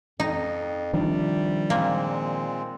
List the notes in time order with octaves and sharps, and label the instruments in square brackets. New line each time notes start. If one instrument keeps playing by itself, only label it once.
[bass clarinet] F2 [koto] D#4
[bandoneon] C3 [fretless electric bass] D#3 F3 D4 [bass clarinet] G3
[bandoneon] A#2 G#3 C4 [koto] A#3